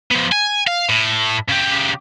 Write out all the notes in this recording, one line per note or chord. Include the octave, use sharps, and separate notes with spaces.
F3 B3
G#5
F5
A2
C#3 G4